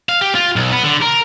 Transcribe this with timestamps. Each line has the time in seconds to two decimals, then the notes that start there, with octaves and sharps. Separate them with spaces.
0.09 F5
0.21 G4
0.35 F4
0.56 B1
0.72 B3
0.84 D3
1.02 A#4